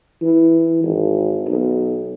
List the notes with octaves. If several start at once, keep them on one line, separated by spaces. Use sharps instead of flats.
E3
G#1
B1